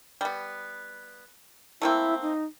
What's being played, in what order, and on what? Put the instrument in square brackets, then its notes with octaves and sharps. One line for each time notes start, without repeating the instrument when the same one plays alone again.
[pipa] G3 B3
[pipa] A3 A#3 C4 [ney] E4
[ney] D#4